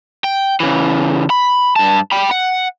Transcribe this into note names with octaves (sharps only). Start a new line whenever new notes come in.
G5
C#3 E3
B5
G2 A5
G5 B5
F#5